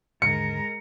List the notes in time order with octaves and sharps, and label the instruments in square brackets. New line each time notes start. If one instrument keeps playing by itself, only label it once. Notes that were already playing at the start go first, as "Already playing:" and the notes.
[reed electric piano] D#2 G#2 D3 [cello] G#3 A#4 [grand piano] C#7